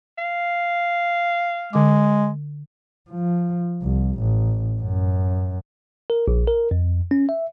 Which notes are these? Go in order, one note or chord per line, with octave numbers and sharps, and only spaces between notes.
F5
D3 G#3 D6
F3
C2
A1
F#2
A#4
A#1
A#4
F2
C#4
E5